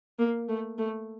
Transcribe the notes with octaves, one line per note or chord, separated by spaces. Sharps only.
A#3
A3
A3